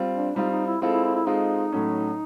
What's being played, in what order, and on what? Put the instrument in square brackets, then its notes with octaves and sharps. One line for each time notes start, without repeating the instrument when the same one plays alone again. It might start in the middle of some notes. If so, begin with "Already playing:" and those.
Already playing: [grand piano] G3 C4 F4
[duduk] D4
[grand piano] G3 C4 F4 [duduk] D#4
[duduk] D#4
E4
[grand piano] G#3 C4 F4 A4 [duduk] E4
[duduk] E4
E4
E4
[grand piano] G#3 C4 F4 A4 [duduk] D#4
[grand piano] A2 F#3 A3 C#4